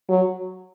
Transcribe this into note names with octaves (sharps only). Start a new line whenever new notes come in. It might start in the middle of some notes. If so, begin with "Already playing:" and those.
F#3